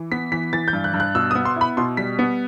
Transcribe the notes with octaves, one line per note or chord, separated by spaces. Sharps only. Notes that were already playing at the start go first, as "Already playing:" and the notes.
Already playing: E3
B3 B6
E3 B6
E3 A6
G6
G2
F#6
G2
F#6
B2 E6
D#6
B3
C6
E4 B5
B2 C6
G3 B6
B3